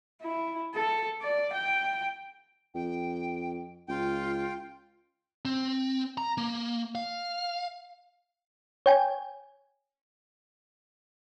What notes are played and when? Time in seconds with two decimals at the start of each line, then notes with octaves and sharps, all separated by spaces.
0.22 E4
0.75 A4
1.22 D5
1.53 G5
2.75 F2 G5
3.88 C#2 F4 G5
5.45 C4
6.18 A#5
6.38 A#3
6.95 F5
8.86 C#5 G5 G#5